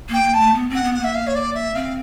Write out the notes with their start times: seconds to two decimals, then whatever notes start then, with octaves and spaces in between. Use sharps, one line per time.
0.09 A#3 G5
0.23 A#3
0.34 A5
0.39 A3
0.54 B3
0.70 C4 F#5
0.84 B3
0.94 F#5
1.00 A#3 E5
1.15 F5
1.27 C#5
1.35 D5
1.55 E5
1.75 C4 F5